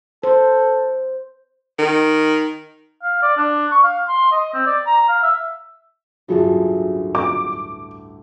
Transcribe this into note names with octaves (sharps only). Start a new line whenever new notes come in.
A4 C5
D#3
F5
D5
D4
C#6
F5
C6
D#5
C4
D5
A#5
F5
E5
A1 D2 G2 F#3 F4 G#4
D6